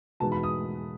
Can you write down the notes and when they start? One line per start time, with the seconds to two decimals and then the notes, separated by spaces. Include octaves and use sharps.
0.20 E2 B2 G#3 B3 D#4 A5
0.32 B5
0.43 D#6